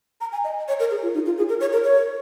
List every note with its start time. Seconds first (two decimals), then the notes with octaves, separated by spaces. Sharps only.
0.21 A#5
0.32 G#5
0.44 D#5
0.68 C#5
0.80 A#4
0.91 G#4
1.03 F4
1.14 D#4
1.26 F4
1.38 G#4
1.49 A#4
1.60 C#5
1.73 A#4
1.84 C#5